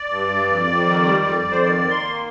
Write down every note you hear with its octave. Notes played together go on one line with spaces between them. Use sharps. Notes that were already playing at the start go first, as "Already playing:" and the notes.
Already playing: D5
G2
G2
F2
F2
D#3
G3
F2
F2
C5
D#3 D5
D#3
C6
A#3